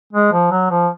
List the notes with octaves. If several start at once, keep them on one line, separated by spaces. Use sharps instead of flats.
G#3
F3
F#3
F3